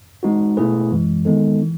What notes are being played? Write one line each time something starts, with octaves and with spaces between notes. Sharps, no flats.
G#3 D#4 F#4
B2 A3 E4 G#4 B4
F#2 E3 G#3
D#3 G#3 B3 D#4 A4
E3